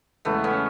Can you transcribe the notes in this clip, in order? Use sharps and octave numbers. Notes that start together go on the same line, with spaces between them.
E2 C#3 E3 G#3 A3 B3
B3 C#4